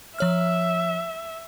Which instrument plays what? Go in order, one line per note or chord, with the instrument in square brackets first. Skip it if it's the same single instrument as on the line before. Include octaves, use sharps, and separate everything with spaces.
[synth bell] F3 C#5 F6 [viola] E5